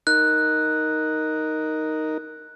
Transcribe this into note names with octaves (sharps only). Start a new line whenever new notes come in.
D#4 A#4 F#6